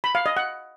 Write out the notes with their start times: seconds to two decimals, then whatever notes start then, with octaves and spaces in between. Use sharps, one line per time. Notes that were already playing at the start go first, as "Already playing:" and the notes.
0.04 B5
0.15 F5
0.26 D#5
0.37 F#5